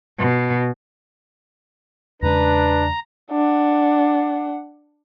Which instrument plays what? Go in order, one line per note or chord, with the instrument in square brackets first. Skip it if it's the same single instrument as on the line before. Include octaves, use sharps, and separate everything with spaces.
[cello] B2
[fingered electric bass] E2 C#3 G#3 [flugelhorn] D4 [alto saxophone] B4 [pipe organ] A#5
[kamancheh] D4 F#5